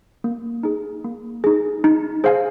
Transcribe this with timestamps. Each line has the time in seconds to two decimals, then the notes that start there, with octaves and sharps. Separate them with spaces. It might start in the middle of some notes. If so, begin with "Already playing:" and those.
0.24 A#3
0.63 D#4 G#4
1.04 A#3
1.44 D#4 G#4
1.84 D#4
2.24 G#4 C5 F5 G#5